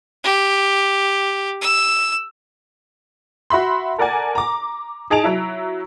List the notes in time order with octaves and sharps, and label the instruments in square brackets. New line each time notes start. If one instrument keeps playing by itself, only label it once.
[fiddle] G4
E6
[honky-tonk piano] F#4 E5 B5 C6
A4 A#4 D5 F#5 G#5
A#5 D6
D#4 G#4 A5 D7 F7
F#3 E4